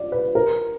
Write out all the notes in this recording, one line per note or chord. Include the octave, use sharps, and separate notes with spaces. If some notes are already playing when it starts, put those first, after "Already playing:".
Already playing: D5
B4
A#4